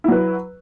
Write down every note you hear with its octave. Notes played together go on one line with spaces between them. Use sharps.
F#3 E4 B4